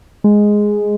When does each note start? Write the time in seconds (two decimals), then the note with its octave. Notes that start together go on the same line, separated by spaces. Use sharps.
0.24 G#3